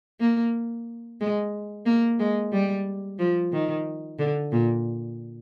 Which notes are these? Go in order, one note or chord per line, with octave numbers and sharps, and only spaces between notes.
A#3
G#3
A#3
G#3
G3
F3
D#3
D3
A#2